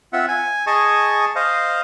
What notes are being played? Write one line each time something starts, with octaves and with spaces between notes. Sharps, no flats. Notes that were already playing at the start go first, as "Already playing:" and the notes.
C4 F4 E5 F#5
G#5
G#4 D#5 G#5 A5 C#6
C5 D#5 F5